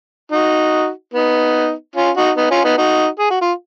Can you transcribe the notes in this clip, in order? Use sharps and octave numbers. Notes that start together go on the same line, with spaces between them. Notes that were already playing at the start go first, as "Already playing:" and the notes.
D#4 F#4
B3 D#4
C#4 F4
D#4 F#4
B3 D#4
C#4 F4
B3 D#4
D#4 F#4
G#4
F#4
F4